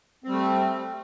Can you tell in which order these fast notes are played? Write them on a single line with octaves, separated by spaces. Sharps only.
C4 G3 A3